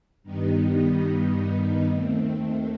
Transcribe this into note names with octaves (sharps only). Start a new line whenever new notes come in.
G2 D#3 G3 B3 D#4
D#2 D#3 A3 C4